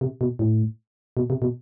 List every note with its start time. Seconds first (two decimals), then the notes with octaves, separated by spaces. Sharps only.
0.01 C3
0.21 B2
0.39 A2
1.17 B2
1.30 C3
1.42 B2